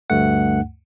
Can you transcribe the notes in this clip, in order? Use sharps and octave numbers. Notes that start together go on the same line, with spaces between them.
D2 G2 A3 F#5